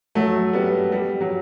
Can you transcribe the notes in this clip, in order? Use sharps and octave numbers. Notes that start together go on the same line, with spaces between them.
F#3 A3
G3 B3
G3
F#3